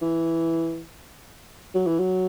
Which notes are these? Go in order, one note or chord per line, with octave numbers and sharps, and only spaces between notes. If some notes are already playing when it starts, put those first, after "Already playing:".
E3
F#3
E3
F#3